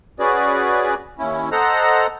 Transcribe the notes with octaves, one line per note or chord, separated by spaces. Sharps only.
C#4 F#4 G#4 B4 D5
D#2 C#4 E4
A4 C5 D#5 F#5 A#5